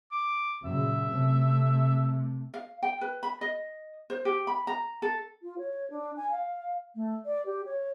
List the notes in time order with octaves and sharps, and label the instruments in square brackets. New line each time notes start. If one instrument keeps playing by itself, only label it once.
[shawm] D6
[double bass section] F#2 A#2 C#3 [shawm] E5
[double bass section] C3 A3
[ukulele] F5
G5
B4
B5
D#5
C5
G4
B5
A#5
A4
[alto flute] F4
C#5
D4
G#5
F5
A3
D5
G4
C#5